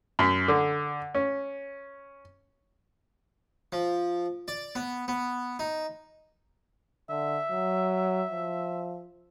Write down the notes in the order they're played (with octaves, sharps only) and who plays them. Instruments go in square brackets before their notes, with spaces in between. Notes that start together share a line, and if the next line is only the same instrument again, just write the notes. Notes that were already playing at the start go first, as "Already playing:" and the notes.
[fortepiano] F#2
D3
C#4
[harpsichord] F3
D5
B3
B3
D#4
[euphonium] D3 [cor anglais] E5
[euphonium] F#3
F3